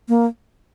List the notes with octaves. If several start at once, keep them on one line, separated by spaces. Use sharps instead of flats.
A#3